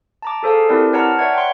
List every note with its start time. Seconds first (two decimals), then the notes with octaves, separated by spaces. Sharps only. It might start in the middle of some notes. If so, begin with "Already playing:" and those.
0.22 A5 A#5 D6
0.43 G#4 A4 C5 F5 A5
0.69 C4 E4 G4 A#4 C5 D5
0.93 B4 C#5 F#5 A5 A#5 F6
1.19 B4 C#5 D5 E5 F#5 G#6
1.34 G5 A#5 C6